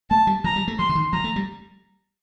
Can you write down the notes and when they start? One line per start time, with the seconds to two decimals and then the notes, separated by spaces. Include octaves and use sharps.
0.10 A3 A5
0.27 G3
0.44 F3 A#5
0.56 G3
0.68 A3
0.79 F3 C6
0.89 D3
0.95 D#3
1.13 F3 A#5
1.24 A3
1.36 G3